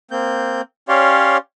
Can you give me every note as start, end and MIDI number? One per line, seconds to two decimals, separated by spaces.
0.11 0.61 58
0.11 0.61 60
0.11 0.61 91
0.89 1.37 61
0.89 1.37 67
0.89 1.37 73
0.89 1.37 74
0.89 1.37 77
0.89 1.37 84